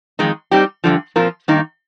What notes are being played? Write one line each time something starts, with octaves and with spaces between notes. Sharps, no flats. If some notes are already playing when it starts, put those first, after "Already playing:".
F2 D#3 G#3 D#4
G3 C4 D#4 G4
G2 D3 F3
A#2 F3 C4 F4 A#4
G2 D#3 A#3 D#4